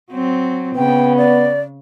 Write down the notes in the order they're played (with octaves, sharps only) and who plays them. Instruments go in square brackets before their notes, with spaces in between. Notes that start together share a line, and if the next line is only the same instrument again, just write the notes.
[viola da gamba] F#3 C4
[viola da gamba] C#3 [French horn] B3 [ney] G5
[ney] D5